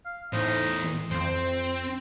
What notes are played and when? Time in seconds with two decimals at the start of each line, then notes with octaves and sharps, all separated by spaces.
0.05 F5
0.33 E2 A2 D#4 C5
1.11 F2 C4 C5